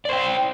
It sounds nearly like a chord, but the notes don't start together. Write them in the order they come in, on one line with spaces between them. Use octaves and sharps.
D5 C5 G5